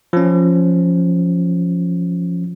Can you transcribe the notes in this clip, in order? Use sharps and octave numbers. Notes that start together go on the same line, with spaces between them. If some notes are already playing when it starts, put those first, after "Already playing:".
F3 C#4